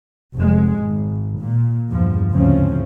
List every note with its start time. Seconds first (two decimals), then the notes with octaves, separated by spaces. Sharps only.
0.36 F1 G#3
0.80 G#1
1.40 A#2
1.91 E2 G2 F3
2.32 D2 G#2 C#3 F3 C4 C#4